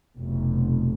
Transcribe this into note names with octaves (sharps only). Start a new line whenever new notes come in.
F1 B1